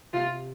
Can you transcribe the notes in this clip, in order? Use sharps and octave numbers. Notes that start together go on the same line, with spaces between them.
C3 F4